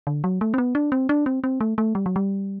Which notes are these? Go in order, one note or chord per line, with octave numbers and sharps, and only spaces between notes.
D3
F#3
A3
C4
B3
D4
C4
D4
C4
C4
A3
A3
G3
F#3
G3